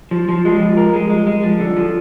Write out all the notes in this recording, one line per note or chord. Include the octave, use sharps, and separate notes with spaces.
F3
F3
G#3
F3
A#4
G#3
G#3
G#3
F3
D3
F3